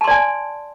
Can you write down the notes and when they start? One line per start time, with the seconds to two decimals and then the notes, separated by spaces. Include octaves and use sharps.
0.01 A5
0.04 C6
0.08 D5
0.11 G#5